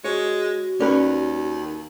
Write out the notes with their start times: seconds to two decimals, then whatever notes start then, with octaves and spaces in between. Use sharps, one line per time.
0.04 G#3 F#4 C#5
0.80 D#2 C#4 B4 D5